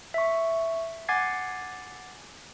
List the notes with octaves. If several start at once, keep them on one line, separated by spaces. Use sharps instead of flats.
E5 C#6
F#5 G#5 D6 G#6 A6 C7